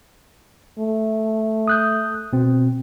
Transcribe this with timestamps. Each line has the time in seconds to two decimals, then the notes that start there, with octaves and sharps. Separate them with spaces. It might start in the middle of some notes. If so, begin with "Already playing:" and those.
0.79 A3
1.68 D#6 F#6 G6
2.33 B2 C4